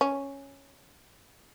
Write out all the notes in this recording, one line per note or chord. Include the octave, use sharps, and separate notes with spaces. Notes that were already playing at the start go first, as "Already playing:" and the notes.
C#4